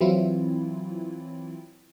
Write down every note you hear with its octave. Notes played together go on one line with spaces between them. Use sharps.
E3 F#3 C4 E4 F4